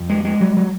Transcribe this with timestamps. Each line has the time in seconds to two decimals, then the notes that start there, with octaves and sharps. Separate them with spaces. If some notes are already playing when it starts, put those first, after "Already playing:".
Already playing: F2
0.09 G#3
0.25 G#3
0.41 F#3
0.57 F#3